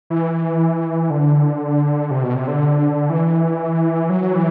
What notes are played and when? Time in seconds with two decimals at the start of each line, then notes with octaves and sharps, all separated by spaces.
0.10 E3
1.10 D3
2.11 C3
2.23 B2
2.35 C3
2.48 D3
3.10 E3
4.10 F#3
4.35 E3